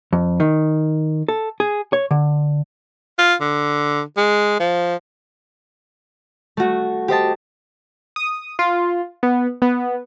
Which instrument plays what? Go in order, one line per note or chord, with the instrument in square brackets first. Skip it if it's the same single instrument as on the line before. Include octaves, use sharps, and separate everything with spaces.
[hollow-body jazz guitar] F2
D#3
A4
G#4
C#5
D3
[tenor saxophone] F4
D3
G#3
F3
[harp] A3 F#4
G4 C5 D#5 A5
[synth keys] D#6
F4
B3
B3